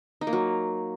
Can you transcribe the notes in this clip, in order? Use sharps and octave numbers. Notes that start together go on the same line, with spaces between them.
D#4
A#3
F#3